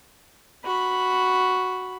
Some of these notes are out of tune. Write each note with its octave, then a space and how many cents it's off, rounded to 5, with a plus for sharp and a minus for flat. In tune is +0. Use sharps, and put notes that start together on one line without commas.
F#4 +0 B5 +0